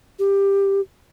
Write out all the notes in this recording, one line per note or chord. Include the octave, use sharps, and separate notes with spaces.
G4